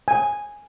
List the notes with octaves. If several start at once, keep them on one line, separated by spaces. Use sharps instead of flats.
G#5